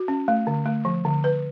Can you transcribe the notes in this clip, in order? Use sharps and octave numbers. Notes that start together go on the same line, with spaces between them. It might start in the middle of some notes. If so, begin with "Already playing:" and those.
Already playing: F#4
C#4
A3
D3
A3
F3
D3
B4